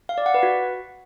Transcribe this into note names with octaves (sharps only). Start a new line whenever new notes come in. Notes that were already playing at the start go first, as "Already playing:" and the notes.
F5
D5
F#5
B4
F#4